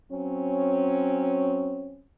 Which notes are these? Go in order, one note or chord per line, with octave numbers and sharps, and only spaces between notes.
F#3 C4 C#4